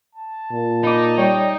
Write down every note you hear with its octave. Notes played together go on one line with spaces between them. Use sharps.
A5
A#2
D#4 B5 D6
G3 C#5 D5 G5